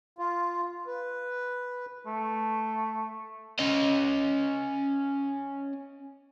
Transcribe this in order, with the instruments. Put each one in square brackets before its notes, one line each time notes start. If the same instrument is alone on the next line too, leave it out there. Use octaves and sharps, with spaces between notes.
[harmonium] F4
B4
[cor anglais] A3
[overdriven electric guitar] C#4 D#5